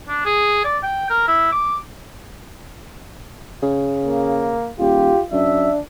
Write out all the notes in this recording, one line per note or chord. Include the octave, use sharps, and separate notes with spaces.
D4
G#4
D5
G5
A#4
E4
D6
C#3
A#3
D#1 F4 G4
F#2 D4 E5